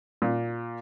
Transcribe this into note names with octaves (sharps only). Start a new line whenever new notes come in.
A#2